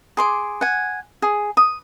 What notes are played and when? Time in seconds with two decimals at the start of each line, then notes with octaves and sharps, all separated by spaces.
0.17 G#4 C6 D6
0.61 F#5 G#5
1.22 G#4
1.57 D#6